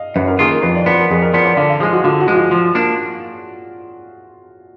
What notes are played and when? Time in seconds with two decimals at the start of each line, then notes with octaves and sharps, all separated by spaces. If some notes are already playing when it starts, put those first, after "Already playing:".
Already playing: D#5 F5
0.16 F#2 B4
0.27 A#4
0.39 D#3 A#3 F4 G#4
0.51 A#4
0.63 F2 B4
0.75 D5
0.86 F3 B3 B4
0.98 A#4
1.11 F2 G#4
1.22 A#4
1.33 F3 B3 D5
1.45 D5
1.57 D3 F5
1.70 F5
1.80 F3 G#4
1.83 G#3
1.93 F#4
2.04 D3 F4
2.20 F#4
2.28 F3 G#3
2.36 F4
2.51 F3
2.75 A#3 D4